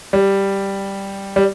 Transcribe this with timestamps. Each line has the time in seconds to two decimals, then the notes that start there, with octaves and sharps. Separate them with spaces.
0.13 G3
1.36 G3